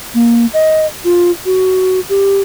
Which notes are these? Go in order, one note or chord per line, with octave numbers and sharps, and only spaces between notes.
A#3
D#5
F4
F#4
G4